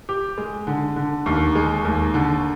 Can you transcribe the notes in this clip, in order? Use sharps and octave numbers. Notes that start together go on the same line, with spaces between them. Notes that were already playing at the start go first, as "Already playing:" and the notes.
G4
G#3
D3
D3
D#2
G#3
D#2
D3